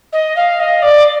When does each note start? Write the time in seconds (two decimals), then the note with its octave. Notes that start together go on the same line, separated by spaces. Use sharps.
0.12 D#5
0.36 F5
0.59 D#5
0.82 D5